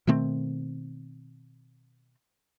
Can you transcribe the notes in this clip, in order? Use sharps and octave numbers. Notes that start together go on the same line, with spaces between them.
B2 D#3 A3 C4